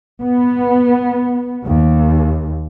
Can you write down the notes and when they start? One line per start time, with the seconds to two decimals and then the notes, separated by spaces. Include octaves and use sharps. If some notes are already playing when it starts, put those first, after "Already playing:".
0.22 B3
1.65 D#2